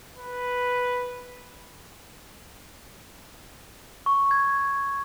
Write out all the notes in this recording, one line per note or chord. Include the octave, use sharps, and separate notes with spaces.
B4
C#6
G#6